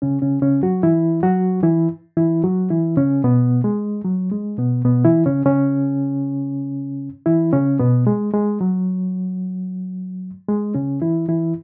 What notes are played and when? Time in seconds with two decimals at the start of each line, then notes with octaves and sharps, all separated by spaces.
0.02 C#3 C#4
0.22 C#3 C#4
0.42 C#3 C#4
0.63 F#3 F#4
0.83 E3 E4
1.23 F#3 F#4
1.63 E3 E4
2.17 E3 E4
2.44 F#3 F#4
2.70 E3 E4
2.97 C#3 C#4
3.24 B2 B3
3.64 G#3
4.04 F#3
4.32 G#3
4.58 B2 B3
4.85 B2 B3
5.05 E3 E4
5.26 C#3 C#4
5.45 C#3 C#4
7.26 E3 E4
7.53 C#3 C#4
7.79 B2 B3
8.07 G#3
8.34 G#3
8.61 F#3
10.48 G#3
10.75 C#3 C#4
11.02 E3 E4
11.29 E3 E4